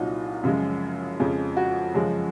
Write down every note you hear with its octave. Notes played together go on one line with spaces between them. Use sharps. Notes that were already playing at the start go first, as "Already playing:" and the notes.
Already playing: C2 A#2 F#3 D#4 F4
F#2 C#3 F3 G#3
F2 C#3 F3 G#3
F#4
F#2 C#3 F3 G#3